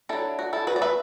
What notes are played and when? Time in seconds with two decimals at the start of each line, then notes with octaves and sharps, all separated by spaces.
0.09 F#3 D4 E4 A4
0.39 F#4
0.53 E4 A4
0.67 F#4 B4
0.76 D5
0.82 B4 E5